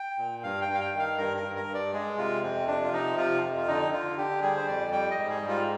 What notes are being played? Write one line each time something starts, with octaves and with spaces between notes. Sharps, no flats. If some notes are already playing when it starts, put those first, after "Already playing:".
Already playing: G5
A#2
G2 F5
G5
G2
F5
G5
D#3
F5
G2 A#4
A#4
G2
A#4
G2
D5
G#3 G#4
C3 F4
F2 C4
C3 D4
F4
F3 D#4
C3 F4
F2
F4
D3 D#4
D3 F4
D3 G4
G3 G#4
C5
F2 D5
G3 G5
D#5
G#2
G#4
G3
F4